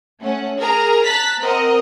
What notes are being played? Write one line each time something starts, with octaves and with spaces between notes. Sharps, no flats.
A3 C#4 F#5
G#4 A#4 A#5
A5 A#5 F#6 A6 B6
C4 A#4 D#5 F#5